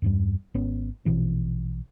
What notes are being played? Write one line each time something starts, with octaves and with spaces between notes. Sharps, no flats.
E2 G2 G3
G#1 B3 C#4
A#1 B2 E3 C4